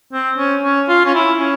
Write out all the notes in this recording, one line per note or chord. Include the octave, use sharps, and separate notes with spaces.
C4
C#4
C#4
F4
C#4
E4
C#4